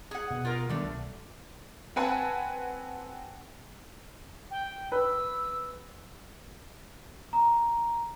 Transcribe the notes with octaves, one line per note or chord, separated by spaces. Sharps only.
G#4 F#5
B2
F4 A#4
D3 D#3 G3 A3 B3
B1
C4 B4 F#5 G#5 A5
G5
B4 E6
A#5